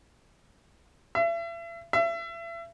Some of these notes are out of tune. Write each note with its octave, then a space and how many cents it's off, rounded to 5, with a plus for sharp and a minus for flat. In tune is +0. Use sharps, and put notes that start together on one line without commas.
E5 +40
E5 +35